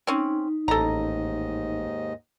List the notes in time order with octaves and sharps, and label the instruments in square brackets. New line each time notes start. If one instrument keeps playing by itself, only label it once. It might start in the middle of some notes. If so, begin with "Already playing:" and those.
[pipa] C4 C#4 [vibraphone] D#4
[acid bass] A1 [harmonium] D#2 G#2 D#5 [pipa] A4 A#5